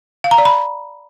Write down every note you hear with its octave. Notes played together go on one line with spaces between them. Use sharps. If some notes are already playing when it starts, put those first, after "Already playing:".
F5
A#5
D5
B5